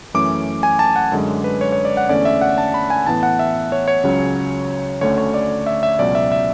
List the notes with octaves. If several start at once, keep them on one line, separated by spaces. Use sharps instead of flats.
F#2 E3 A3 C#4 D6
G#5
A5
F#5
F#2 D3 G#3 C#4
B4
C#5
C#5
D5
F#5
E2 D3 A3 C#4 D5
E5
F#5
A5
B5
G#5
A2 E3 B3 A5
F#5
E5
C#5
C#5
C#2 C#3 F#3 C#4
D2 D3 A3 C#4 C#5
C#5
D5
E5
E5
C#2 B2 F#3 C#4 D5
E5
E5